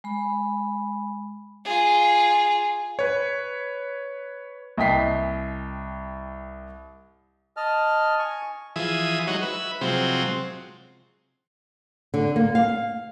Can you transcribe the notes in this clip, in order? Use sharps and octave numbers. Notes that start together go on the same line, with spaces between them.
G#3 B5
F4 G#4
B4 C#5
C2 D#5 G5 B6 C7
D#5 A5 F6
G#5 C#6
E3 F3 G#4 E5 D#6
F#3 G#3 D#4 F#4 C#5
B4 E5
C3 F3 F#3 G#3 C4
D3
A#3
F5